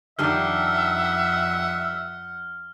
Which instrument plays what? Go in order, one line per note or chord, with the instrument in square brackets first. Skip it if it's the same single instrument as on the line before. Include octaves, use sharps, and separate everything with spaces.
[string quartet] F2 F#5 [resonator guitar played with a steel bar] D#3 G3 D4 [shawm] E5 [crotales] F6